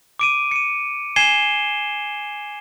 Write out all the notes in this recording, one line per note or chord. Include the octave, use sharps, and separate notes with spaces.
D6 D7 D#7
C#7 D#7
G#5 G#6 C7 D#7 E7 G7